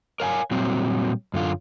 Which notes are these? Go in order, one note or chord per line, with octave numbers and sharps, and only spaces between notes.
A#4 C#5 F5 G5 G#5
A#2 F#3 G3 C4
F#2 D3 F4